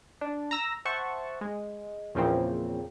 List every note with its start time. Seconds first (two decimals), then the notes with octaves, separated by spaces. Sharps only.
0.21 D4
0.51 A#5 E6 A#6
0.85 C5 E5 F#5 A5 C#6
1.41 G#3
2.15 E2 A#2 C#3 F3 A#3 C4